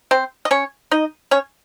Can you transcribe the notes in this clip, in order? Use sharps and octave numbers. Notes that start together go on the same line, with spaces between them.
C4 C5
D#5
C#4 C#5
D#4 D#5
C#4 C#5